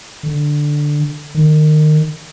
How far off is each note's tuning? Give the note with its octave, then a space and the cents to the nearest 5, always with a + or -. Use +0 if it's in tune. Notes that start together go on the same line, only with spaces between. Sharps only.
D3 +5
D#3 -25